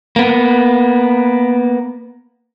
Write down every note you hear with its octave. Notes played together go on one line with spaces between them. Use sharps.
A#3 B3